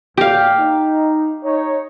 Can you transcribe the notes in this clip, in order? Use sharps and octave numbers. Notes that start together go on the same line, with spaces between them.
B1 A#2 G4 F5
D#4
D#4 C#5